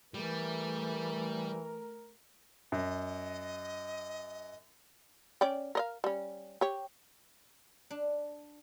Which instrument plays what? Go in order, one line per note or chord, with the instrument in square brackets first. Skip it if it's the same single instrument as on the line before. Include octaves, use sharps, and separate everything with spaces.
[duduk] E3 [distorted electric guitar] G3 [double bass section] A3 [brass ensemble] A#4
[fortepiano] F#2 [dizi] D#5
[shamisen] C#4 D5 G5
A#4 D#5 F5
G3 C#4
G4 C#5
[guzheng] D4